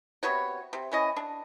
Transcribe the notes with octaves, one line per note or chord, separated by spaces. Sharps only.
C3 B3 F#4 C#5
C3
E3 C#4 D#5
D4